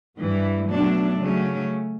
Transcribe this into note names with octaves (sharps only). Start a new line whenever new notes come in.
G2 E3 G3
B2 F#3 A3 D4
C#3 F#3 A3 C#4